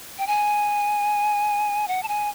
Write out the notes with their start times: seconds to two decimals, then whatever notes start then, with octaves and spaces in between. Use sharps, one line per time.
0.18 G5
0.27 G#5
1.88 F#5
2.03 A5
2.08 G#5